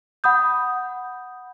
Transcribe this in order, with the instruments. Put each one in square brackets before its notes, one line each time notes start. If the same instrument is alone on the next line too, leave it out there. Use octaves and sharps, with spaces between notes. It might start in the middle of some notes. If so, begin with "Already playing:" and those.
[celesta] F#5 B5 D#6 G6